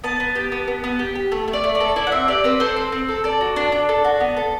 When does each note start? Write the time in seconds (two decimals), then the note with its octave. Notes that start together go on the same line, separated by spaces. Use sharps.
0.04 B3 A5
0.20 B3
0.35 G4
0.52 B3
0.68 B3
0.84 B3
0.99 G4
1.15 G4
1.32 A3
1.48 A3
1.53 D5
1.64 A3
1.75 D5
1.80 A4
1.96 E4 D5
2.07 F#5
2.12 C4 E5
2.28 G4 D5
2.44 C4 B4
2.60 A4 C5
2.76 C4
2.92 C4
3.08 A4
3.24 A4 D5
3.41 F#4
3.56 D4
3.72 D4
3.89 A4
4.04 F#4
4.20 B3
4.37 A4